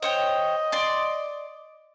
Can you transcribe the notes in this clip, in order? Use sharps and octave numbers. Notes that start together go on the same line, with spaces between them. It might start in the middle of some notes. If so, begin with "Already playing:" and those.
C5 C#5 D#5 G5
D5 C6